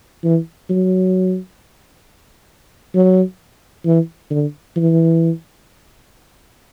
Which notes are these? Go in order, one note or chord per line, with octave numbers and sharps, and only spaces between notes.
E3
F#3
F#3
E3
D3
E3